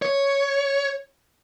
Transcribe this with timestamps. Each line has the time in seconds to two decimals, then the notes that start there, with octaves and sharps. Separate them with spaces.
0.02 C#5